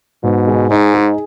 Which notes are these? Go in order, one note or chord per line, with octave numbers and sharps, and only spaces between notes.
G#2 B2
G#3
G#2 D#4
G#4